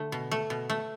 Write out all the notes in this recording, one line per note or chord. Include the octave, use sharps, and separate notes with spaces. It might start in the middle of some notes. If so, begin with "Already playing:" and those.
Already playing: D3 A3
B2
A3
B2
A3